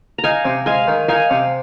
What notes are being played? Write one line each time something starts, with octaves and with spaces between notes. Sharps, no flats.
A#5
D#4 F5 G#5
C3
G#3 F5 G#5
D#3
D#4 F5 G#5
C3